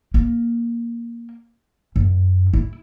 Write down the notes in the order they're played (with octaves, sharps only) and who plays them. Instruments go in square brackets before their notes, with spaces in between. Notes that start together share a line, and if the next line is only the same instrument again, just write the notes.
[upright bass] A#3
F#2
E4